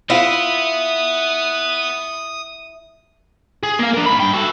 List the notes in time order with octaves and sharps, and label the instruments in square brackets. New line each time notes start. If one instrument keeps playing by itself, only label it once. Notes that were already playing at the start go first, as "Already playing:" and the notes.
[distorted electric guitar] B3 [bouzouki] E4 [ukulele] F4 F5 [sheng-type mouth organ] D#6
[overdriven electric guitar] G#4
A#3 F5
D4 A#4
G#2 B5
G2 G5
F#4 A4